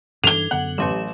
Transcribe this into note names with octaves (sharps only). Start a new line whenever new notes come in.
G2 E3 D4 A4 G#6 F7 G7
F#2 D3 B3 F#5 F#7
A1 F#3 G4 E7